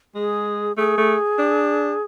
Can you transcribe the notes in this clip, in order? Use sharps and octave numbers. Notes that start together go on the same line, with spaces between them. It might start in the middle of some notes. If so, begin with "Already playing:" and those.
G#3 G#4
A3 G#4
A3
D4